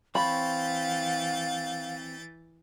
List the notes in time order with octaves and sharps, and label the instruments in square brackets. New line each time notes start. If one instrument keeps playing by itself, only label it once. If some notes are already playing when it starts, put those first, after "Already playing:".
[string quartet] E3 G6 A6 [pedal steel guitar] C4 C#5 [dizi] F5 [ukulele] B5